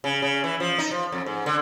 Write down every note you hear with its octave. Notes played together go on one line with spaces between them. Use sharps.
C#3
C#3
E3
F3
D#4
F3
F2
G#2
D3